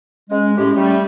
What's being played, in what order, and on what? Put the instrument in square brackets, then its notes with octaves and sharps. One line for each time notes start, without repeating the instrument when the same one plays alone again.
[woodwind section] G#3 [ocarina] C#4
[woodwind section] A2 G#3 G4 [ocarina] C#4
[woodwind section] G3 A3